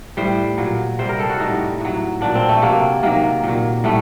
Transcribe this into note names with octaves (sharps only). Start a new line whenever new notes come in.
A2 G3 C5
A#2 F#3
C3 G3 C5
A#4
A4
F#4
A2 G3 D#4
A2 F#3
A#2 F#3 D4
C4
A3
C3 F#3 A#3
C3 D#3 F#3 A#3
A#2 F#3
A2 G3 A3